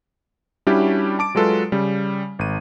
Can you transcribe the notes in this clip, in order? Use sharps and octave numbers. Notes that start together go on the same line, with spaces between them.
G3 C#4 D4 E4 F#4 G4
A5 D6 D7
F#3 G#3 F4 A4 B4
C#3 G3
G#1 D#7